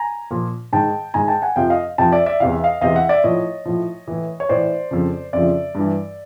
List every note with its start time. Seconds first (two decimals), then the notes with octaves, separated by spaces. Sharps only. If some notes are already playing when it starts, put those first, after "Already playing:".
Already playing: G#5 A#5
0.31 A#2 F3
0.73 G#2 D#3 G5 A5
1.14 G#2 D#3 G#5 A#5
1.28 G5 A5
1.42 F#5 G#5
1.56 F2 C3 F3 F5 G5
1.70 D#5 F5
1.98 F2 C3 F3 G5 A5
2.12 D5 E5
2.26 D5 E5
2.40 E2 C3 E3 F5
2.52 E5
2.63 D#5 F5
2.81 E2 C3 E3 D#5 F5
2.95 E5 F#5
3.09 D5 E5
3.24 A2 F3 C#5 D#5
3.66 A2 F3
4.08 A2 E3
4.40 C#5
4.49 A2 E3 C5 D5
4.91 F2 C#3 F3
5.33 F2 C#3 F3 D5 E5
5.75 G2 E3